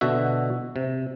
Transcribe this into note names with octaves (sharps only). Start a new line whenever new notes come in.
B2 D3 F#4 E5
C3